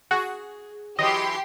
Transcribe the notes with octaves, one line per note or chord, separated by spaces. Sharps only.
F#4 G#4
E3 F#3 G4 D#5 C6